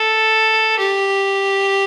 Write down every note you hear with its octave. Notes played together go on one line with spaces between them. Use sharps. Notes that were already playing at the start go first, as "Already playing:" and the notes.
Already playing: A4
G4